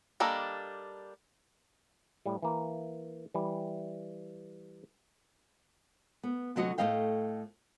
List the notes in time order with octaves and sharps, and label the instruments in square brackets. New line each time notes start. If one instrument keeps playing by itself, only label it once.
[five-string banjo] G3 A#3 D4 A4 D#5
[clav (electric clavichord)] A2 G3
E3 A#3
E3 G3
[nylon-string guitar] B3
D2 C3 F#3 F#4 D#5 F#5
A2 A3 A#3 D#5 F5 G5